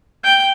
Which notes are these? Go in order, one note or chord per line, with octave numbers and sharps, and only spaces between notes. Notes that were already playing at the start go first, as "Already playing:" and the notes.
G5